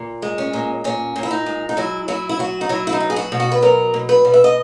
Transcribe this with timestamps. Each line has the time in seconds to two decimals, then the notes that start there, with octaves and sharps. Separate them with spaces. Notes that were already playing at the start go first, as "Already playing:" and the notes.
Already playing: A#2
0.22 G#3
0.38 C#4
0.53 A#2
0.84 A#2 C#4
1.16 A#2
1.23 E4
1.31 D#4
1.46 G#3
1.69 D#4
1.77 F#3 E4
2.08 F#3 E4
2.29 E4
2.39 F#3 F#4
2.61 D#4
2.69 F#3 E4
2.87 E4
2.93 D#4
3.00 B2
3.10 G#4
3.16 F#4
3.32 B2
3.40 F#4
3.52 B4
3.62 F#3 A#4
3.94 B2
4.09 B4
4.25 B2
4.33 E5
4.44 D#5